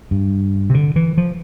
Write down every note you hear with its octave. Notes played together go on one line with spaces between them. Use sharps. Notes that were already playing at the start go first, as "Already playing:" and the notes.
G2
C3
D3
E3
F3